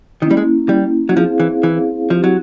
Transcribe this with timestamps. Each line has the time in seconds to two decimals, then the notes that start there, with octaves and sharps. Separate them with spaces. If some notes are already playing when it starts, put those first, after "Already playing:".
0.22 D#3 A#3 C#4 E4
0.31 G3
0.37 G#3
0.69 G3
1.09 F#3
1.16 F3 C4 E4 G#4 C5 F5
1.40 E3
1.63 E3
2.10 F3 C4 E4 G4
2.24 F#3